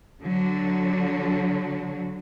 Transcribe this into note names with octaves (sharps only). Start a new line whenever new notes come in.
D3 F#3